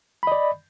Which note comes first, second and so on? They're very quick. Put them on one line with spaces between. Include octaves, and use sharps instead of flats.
B5 D#5 D5